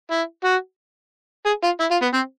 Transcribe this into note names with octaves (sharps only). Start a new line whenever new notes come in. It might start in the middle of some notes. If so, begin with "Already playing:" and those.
E4
F#4
G#4
F4
E4
F4
B3
C4